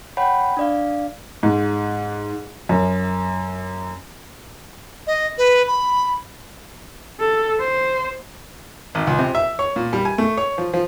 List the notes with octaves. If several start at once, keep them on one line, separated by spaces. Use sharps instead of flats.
C#5 F#5 G5 B5
D4 D5 F5
G#2
F#2
D#5
B4
B5
A4
C5
G#1
C#2
C3
E5
C#5
A#2
G3
G#5
A3
C#5
F3
F3